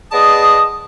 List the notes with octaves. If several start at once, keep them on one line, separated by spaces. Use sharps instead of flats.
B3 G#4 D5 D#5 A5 D#6